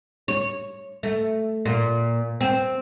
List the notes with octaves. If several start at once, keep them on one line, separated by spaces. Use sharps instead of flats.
C#5
A3
A#2
C4